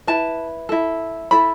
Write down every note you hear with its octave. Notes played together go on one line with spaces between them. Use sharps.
E4 B4 A5
E4 A4
E4 A4 B5